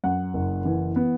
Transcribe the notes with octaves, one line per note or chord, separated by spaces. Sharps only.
F#2 F#5
F#1
E3
B3